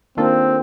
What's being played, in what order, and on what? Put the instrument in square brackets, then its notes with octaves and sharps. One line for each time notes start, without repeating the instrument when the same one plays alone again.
[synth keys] D#3 A#3 D4 F4 A4 [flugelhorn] C4